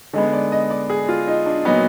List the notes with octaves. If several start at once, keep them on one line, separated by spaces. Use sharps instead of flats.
D3 G#3 B3 D#4
D5
D#5
D5
G#4
F4
D#4
D4
A#2 F#3 B3 D#4